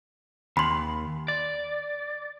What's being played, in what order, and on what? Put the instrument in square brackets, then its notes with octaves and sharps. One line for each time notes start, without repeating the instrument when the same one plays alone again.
[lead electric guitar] D#2 [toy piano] B5 C6
[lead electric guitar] D5